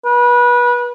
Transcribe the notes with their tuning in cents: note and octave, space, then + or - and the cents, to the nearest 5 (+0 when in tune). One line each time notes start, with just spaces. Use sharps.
B4 -25